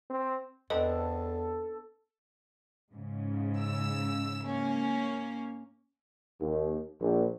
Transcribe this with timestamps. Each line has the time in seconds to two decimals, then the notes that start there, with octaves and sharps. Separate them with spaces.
0.10 C4
0.70 E2 B3 C4 D4 A4 D#5
2.92 G#2 C#3
3.59 E6
4.44 A#3 C#4
6.41 D#2
7.00 A#1